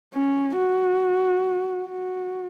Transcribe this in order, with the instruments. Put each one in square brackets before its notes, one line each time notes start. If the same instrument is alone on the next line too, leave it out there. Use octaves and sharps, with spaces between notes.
[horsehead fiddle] C#4
F#4
F#4